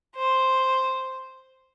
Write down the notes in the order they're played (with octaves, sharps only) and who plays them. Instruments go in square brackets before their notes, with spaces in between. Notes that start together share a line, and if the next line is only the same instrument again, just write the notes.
[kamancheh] C5